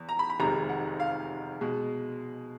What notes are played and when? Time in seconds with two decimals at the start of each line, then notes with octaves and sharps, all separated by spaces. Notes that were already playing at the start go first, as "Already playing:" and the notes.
Already playing: E2
0.09 A#5
0.19 B5
0.30 B5
0.40 F1 F2 C3 D#3 G#3 A#5
0.69 F#5
1.00 F5
1.61 B2 G#3